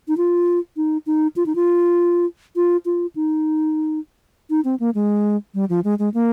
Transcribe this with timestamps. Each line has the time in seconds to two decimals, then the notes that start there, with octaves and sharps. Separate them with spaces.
0.08 D#4
0.17 F4
0.77 D#4
1.07 D#4
1.36 F4
1.46 D#4
1.55 F4
2.56 F4
2.86 F4
3.16 D#4
4.50 D#4
4.65 C4
4.80 A#3
4.95 G#3
5.54 G3
5.69 F3
5.84 G#3
5.99 G#3
6.14 A#3